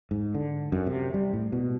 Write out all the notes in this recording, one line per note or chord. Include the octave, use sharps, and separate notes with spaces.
G#2
D3
F#2
C3
G3
A2
B2